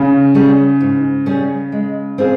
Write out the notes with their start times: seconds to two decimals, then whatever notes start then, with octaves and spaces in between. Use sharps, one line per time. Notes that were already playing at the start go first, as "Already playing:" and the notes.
Already playing: C#3
0.34 G3 C#4 G#4
0.80 G#2
1.26 G3 C#4 G#4
1.72 G#3
2.18 C4 F4 G#4 C5